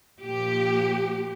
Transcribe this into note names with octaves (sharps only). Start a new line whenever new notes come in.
A#2 F3 A#3 G4